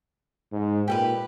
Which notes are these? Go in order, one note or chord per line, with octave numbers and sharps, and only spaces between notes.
G#2
A#2 G4 A4 B4